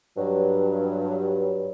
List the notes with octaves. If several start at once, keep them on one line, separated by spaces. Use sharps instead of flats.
G2 F#3